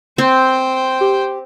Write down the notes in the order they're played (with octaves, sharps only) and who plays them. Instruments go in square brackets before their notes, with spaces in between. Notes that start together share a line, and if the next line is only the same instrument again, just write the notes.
[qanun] C4 [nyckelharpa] C5 G5
[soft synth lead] G4